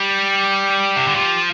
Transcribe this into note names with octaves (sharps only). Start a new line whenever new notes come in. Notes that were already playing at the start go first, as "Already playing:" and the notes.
Already playing: G3 G4
C3
D3
F3 G4